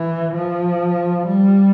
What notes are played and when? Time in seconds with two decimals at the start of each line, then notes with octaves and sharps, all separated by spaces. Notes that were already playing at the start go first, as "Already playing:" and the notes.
Already playing: E3
0.35 F3
1.27 G3